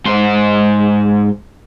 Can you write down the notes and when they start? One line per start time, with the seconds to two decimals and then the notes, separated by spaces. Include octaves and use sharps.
0.06 G#2 C5